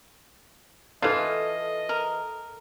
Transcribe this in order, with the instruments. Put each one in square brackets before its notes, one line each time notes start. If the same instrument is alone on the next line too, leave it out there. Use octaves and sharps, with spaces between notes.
[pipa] E3 F4 [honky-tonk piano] A4 F6 E7 [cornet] D#5
[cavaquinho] A#4